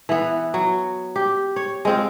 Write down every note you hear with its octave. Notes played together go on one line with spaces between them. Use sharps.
E3 B3
F#3
G4
C#5
G#3 C4 F4